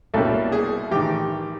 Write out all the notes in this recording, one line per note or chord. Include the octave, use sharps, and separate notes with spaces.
C2 B2 G3 A#3 C#4 A4
G#4
A1 D#3 G4